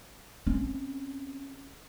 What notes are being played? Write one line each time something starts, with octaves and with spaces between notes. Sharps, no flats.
C4 C#4